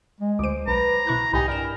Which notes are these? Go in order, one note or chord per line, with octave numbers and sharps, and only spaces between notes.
G#3
D2 C5 D6 D7
B1 B4 A#5
B2 E4 C#6 F#6
C2 A2 D#4 G4 G#5 B5
G2 A#4 D5 E7